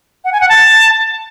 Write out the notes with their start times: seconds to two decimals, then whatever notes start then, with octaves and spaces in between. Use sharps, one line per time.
0.25 F#5
0.33 G#5
0.41 F#5
0.49 A5